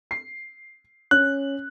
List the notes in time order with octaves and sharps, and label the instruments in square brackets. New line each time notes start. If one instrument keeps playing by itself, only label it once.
[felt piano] C7
[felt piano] C#4 [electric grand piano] F#6